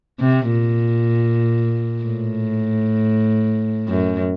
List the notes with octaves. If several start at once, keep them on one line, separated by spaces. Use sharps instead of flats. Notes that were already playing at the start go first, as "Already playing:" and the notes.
C3
A#2
A2
F#2